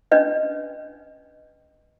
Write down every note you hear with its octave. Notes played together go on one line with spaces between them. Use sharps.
C#4 D4 B4 D#5